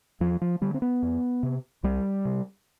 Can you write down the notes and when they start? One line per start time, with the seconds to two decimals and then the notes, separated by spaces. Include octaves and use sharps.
0.20 E2 F3
0.41 F3
0.61 D3 G3
0.74 C4
0.82 B3
1.02 F2
1.43 C3
1.83 C2 G3
2.25 C3